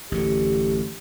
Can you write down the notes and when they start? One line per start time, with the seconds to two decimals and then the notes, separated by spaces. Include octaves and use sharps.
0.12 A1 F#2 D3 G4